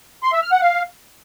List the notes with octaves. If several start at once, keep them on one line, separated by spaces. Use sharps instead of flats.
C6
E5
F6
F#5
F5